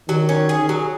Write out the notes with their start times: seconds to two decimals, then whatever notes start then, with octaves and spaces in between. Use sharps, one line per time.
0.09 D#3 F#3
0.29 C#4
0.49 G#4
0.69 F#3